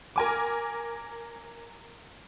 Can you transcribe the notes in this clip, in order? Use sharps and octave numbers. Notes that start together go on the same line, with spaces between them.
A#4 G#5 D6